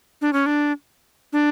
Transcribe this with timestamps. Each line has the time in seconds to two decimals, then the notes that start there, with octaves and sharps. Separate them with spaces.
0.21 D4
0.33 C#4
0.46 D4
1.33 D4